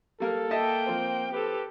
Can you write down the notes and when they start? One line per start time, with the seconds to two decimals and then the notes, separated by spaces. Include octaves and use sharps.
0.20 G3 A#3 A4 A#4
0.51 A#3 D#5 E5 G5 A5
0.87 F3 C4
1.33 G4 A4 B4